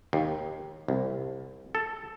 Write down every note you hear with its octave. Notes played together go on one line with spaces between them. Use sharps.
D#2
C2
A4